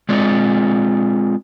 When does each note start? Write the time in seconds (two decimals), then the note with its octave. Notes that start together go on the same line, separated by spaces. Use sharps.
0.09 G#3 C4 F4 G#4 D5